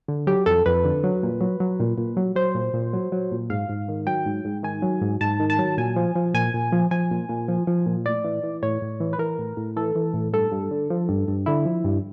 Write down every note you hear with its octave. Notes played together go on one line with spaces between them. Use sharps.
D3
F#3 G4
F2 A4
F2 B4
D3
F#3
A#2
F#3
F#3
A#2
A#2
F#3
F#3 C5
A#2
A#2
F#3
F#3
A#2
G#2 F5
G#2
D#3
F#3 G5
G#2
G#2
D#3 G#5
F#3
G#2
G#2 A5
D#3
A5
F#3
A#2 G#5
F3
F3
A#2 G#5
A#2
F3
F3 G#5
A#2
A#2
F3
F3
A#2
A2 D5
E3
E3
A2 C#5
A2
E3
B4
E3 A#4
A2
A2
E3 A4
E3
A2
G2 A4
G2
D3
F3
G2
G2
D3 E4
F3
G2